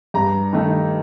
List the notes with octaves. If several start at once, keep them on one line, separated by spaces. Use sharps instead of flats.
G2 A#5
D#3 A3 D#4